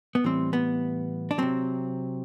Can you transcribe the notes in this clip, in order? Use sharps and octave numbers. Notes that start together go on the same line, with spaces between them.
B3
A2 E3 G3 C4
B3
D4
C3 F#3 C4